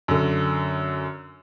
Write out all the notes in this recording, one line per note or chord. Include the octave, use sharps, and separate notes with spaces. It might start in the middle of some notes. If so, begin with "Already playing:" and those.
F#2 D3